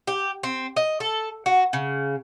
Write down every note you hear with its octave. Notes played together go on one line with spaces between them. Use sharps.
G4
C4
D#5
A4
F#4
C#3